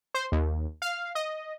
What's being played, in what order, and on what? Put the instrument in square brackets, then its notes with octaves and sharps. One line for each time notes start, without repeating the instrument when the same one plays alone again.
[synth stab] C5
D#2
F5
D#5